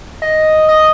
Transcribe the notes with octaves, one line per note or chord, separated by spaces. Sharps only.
D#5
D#5